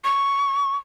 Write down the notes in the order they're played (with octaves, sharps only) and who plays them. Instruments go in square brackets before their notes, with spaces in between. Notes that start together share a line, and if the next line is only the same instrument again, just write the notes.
[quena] C#6